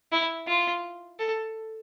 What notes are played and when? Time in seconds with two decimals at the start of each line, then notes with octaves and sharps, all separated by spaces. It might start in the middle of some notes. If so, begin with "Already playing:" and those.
0.12 E4
0.47 F4
1.19 A4